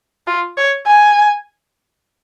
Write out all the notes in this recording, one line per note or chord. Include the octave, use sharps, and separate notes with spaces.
F4
C#5
G#5